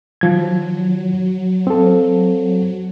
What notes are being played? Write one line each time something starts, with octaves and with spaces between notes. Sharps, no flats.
D#3 F3 F#3 G#6
C4 A4